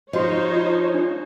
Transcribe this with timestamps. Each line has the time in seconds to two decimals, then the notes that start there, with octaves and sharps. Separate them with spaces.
0.13 F3 D#4 F#4 C5 C#5 D#5
0.53 F4 D#5
0.94 D4 C#5